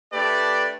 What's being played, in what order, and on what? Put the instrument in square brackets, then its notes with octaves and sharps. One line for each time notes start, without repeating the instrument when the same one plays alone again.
[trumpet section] A3 D4 G4 B4 D5